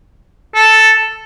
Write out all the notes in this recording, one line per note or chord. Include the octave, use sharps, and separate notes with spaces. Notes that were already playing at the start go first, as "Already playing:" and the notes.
A4